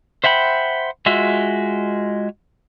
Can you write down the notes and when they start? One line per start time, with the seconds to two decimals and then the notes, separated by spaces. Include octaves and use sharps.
0.24 C5 E5 F#5 G5 B5
1.06 G#3 F4 F#4 E5 E6